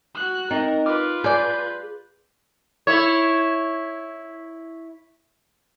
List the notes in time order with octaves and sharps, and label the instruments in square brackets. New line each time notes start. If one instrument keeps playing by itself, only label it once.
[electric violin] F#4 F#6
[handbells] C4 D#5 [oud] D#4 [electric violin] A#4
[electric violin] F4 B4 [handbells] D6 F6
[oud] G#4 D5 [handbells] G6
[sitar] E4 C#5